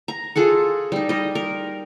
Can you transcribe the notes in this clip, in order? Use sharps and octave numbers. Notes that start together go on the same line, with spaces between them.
A#5
F4 G#4 A4 F#5
G3 D#4
G3 D#5
A#4